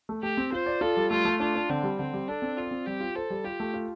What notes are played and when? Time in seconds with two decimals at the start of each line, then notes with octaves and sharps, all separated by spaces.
0.09 A3
0.23 A3 G4
0.37 C4
0.52 F4 C5
0.66 D5
0.81 F4 A4
0.97 G3
1.11 A3 F4
1.25 A3
1.40 D4 F4
1.55 D4
1.69 D3 C4
1.83 G3
1.99 D3 C4
2.13 G3
2.28 D4 A4
2.42 C4
2.57 F4 D5
2.71 C4
2.86 G3 G4
3.00 F4
3.15 A4 C5
3.30 G3
3.44 F4 G4
3.60 A3
3.74 F4